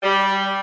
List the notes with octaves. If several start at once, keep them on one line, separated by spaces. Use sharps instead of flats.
G3